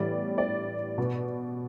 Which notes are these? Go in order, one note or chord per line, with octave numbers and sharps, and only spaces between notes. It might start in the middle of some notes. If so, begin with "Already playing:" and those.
Already playing: A2 E3 G3 B3 D5
D5
B2 B3